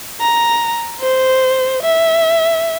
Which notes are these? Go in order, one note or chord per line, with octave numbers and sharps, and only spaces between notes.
A#5
C5
E5